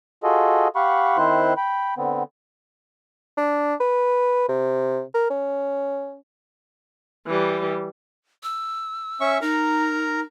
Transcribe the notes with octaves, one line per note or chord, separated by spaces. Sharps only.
F4 F#4 G#4 A4 D#5
G4 F5 F#5 B5 C#6
D#3 C4 E4 C5 C6 F#6
G5 B5
D3 B3 C4
D4
B4
C3
A#4
C#4
E3 G3
E6
C#4 E5 C#6
D#4 A#4 A#5